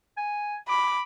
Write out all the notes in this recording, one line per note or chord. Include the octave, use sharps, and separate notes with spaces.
G#5
B5 D6